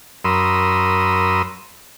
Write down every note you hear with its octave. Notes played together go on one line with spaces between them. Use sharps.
F#2 A#4 B5 C6 D#6 E6